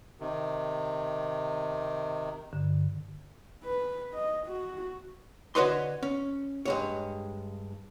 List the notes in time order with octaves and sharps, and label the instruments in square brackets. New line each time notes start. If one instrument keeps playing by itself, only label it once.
[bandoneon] C3 D#3
[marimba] G2 D3
[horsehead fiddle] B4
D#5
F#4
[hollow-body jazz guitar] D3 F#4 B4 C#5 D#5 C6
C#4
G2 G#3 C#5